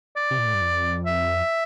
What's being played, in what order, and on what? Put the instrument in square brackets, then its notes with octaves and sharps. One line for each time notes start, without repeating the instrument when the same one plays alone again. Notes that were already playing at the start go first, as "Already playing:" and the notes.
[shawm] D5
[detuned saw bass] C3
A#2
A2
G2
F2
[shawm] E5